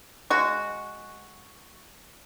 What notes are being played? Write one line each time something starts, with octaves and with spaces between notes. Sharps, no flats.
G#3 F#4